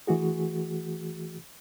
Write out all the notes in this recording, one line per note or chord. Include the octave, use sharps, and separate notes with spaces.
E3 A3 F#4 G#4